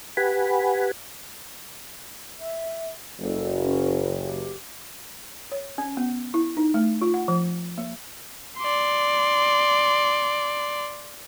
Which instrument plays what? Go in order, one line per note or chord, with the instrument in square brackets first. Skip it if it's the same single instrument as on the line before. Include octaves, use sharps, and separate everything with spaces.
[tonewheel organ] G4 B4 F#5 G#5 B5
[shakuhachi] E5
[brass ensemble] F#1 [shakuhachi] A4
[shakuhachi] C#4
G4
[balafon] C#5
C#4
B3
E4
D#4
A3
F4
F#5
F3
A#3
[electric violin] D5 C6